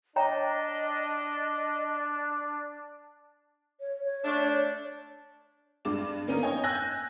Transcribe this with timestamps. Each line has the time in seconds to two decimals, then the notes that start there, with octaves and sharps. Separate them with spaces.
0.16 D4 C#5 D#5 G5 A#5
3.81 C#5
4.04 C#5
4.25 A3 D4
5.85 G2 G#3 D6 E7
6.28 A#3 B3 C#4 D#4 A#4
6.43 C#5 D#5 G5 G#5
6.64 G#5 E6 F#6 G6 A#6